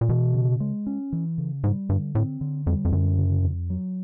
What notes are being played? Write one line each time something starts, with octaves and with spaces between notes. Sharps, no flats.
A#2
B2 E3
C#3
G#3
C#4
E3
C#3
G#2 G3
G2 D3
A2 C4
D3
F2 G3
F2
F#2 D3
C#3
F2
F#3